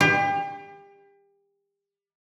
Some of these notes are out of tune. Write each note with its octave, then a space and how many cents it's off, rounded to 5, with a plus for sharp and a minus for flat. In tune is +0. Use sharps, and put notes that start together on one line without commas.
G4 +30